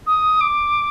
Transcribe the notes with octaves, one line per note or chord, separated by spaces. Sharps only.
D#6
D6